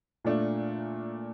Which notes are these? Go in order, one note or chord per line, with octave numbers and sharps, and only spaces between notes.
A#2 A3 D4 F4